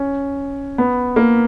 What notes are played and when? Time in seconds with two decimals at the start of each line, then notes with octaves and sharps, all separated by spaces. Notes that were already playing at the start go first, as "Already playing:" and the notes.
Already playing: C#4
0.78 B3
1.16 A#3